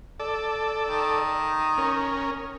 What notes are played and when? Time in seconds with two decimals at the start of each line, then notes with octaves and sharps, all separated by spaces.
0.20 A4 D5
0.88 D#3
1.78 C#4 A#4